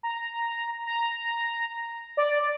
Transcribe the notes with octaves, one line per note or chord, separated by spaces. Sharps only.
A#5
A#5
D5